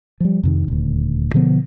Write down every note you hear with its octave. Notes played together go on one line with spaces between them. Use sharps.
F3 G3
F2 C3 D#3
D#1 D2
B2 D3 F3 B3